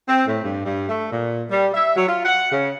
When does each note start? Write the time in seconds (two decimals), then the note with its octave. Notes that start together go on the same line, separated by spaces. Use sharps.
0.08 C4
0.27 A2
0.43 G2
0.66 G2
0.88 A3
1.11 A#2
1.51 G3
1.74 E5
1.96 F#3
2.08 F4
2.25 F#5
2.52 C#3